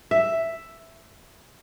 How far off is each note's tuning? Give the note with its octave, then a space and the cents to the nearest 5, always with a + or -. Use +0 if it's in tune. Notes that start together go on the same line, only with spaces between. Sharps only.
E5 +5